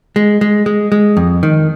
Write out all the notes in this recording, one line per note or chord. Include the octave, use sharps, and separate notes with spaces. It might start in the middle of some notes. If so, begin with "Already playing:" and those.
G#3
G#3
G#3
G#3
F2
D#3